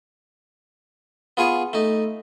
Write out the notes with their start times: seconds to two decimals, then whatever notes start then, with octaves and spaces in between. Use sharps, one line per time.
1.37 B3 F4 G#4 G#5 C#6
1.73 A3 D#4